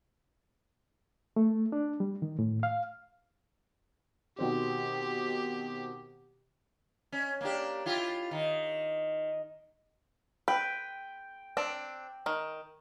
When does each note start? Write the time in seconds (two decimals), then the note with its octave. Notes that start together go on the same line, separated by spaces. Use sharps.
1.36 A3
1.72 D4
2.00 G3
2.22 D#3
2.39 A2
2.63 F5
4.39 B2 D#3 C4 G4
7.12 C#4
7.41 A#3 D4 G4
7.86 E4 F4 G4
8.31 D#3
10.48 B4 G5
11.57 C4 D4
12.26 D#3